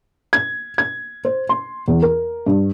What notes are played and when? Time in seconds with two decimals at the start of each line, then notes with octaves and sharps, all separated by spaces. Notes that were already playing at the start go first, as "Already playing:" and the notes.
0.33 G#6
0.78 G#6
1.25 C5
1.49 C6
1.88 E2
2.02 A#4
2.46 G2